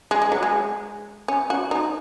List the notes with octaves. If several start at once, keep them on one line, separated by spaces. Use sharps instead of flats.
G#3
G#3
F#3
G#3
C#4
F#4
D#4